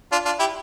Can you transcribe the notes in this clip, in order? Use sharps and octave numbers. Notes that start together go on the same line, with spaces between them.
D4 F4
D4 F4
E4 G4